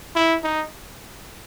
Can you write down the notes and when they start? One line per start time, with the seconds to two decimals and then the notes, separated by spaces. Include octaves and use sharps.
0.15 E4
0.44 D#4